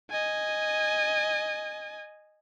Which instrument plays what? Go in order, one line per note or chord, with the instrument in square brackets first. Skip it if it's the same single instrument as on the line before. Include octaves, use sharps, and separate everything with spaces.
[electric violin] D#5 G#5